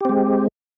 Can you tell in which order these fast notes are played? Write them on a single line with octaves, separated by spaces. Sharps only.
G4 C4 G#3